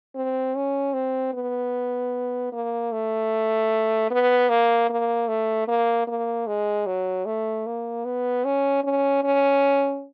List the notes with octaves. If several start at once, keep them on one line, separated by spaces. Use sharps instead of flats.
C4
C#4
C4
B3
A#3
A3
B3
A#3
A#3
A3
A#3
A#3
G#3
F#3
A3
A#3
B3
C#4
C#4
C#4